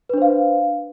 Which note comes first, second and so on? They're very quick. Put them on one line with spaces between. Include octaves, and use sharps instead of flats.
B4 D4 C5 F5